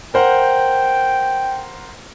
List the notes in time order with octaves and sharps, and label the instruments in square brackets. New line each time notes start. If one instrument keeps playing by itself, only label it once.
[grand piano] A#4 C5 F#5 [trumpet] G5